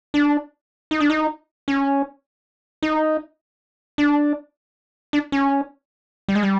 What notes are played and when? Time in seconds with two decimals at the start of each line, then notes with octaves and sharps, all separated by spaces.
0.14 D4
0.91 D#4
1.00 D4
1.10 D#4
1.68 C#4
2.82 D#4
3.98 D4
5.13 D4
5.32 C#4
6.28 G3
6.35 G#3
6.43 G3